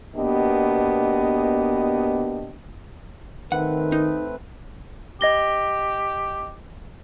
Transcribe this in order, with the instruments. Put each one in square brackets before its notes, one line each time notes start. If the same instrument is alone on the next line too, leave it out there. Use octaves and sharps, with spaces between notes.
[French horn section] B2 A#3 B3 D4 G4 D#5
[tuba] D#3 [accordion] A3 C4 B4 [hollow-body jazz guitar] F#5
[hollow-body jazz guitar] D#4
[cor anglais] G4 [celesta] D#5 A#6 G7